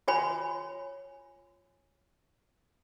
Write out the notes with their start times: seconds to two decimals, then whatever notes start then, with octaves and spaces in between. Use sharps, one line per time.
0.08 F4 F#4 C#5 G#5 B5